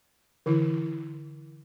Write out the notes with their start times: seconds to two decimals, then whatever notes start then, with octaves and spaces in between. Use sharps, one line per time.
0.46 D3 E3 E4